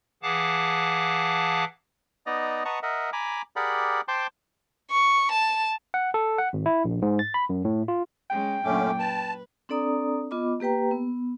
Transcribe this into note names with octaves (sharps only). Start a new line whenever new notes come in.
E3 G#4 F5 F#5 A5 D6
B3 D#4 D5 D#5 A#5
B4 D#5 F#5 A5 A#5 C#6
A#4 D#5 E5 F#5
G#5 A#5 B5 D6
G4 G#4 A#4 D5 F#5 B5
C5 G5 A5 C6 D6
C#6
A5
F#5
A4
F#5
G#1
E4
A#1
G#2
A6
B5
F#2
A2
F4
G#3 C#4 G5
F#2 A#2 D3 A3 C#4 D6
B4 A5
C4 D4 A4 D5 A#5 D#6
B3 F4 D#5 B5 D6
A#3 G4 B4 G5 A#5
B3